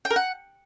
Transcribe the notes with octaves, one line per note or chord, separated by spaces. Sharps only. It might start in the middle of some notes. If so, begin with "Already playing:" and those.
G5
A#4
F#5